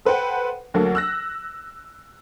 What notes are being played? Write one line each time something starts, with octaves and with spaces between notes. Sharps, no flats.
A4 B4 C5 F#5 G5
D2 F#3 A#3 A4
E6 F#6 A#6